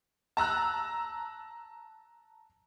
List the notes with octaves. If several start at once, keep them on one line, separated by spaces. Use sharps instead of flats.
A5 A#5 E6 F#6